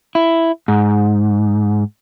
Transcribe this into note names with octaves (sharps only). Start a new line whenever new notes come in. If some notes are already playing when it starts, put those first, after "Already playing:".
E4
G#2